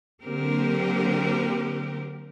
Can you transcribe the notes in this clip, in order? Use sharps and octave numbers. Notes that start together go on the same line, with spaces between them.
D3 F#3 A#3 C4 G4 A#4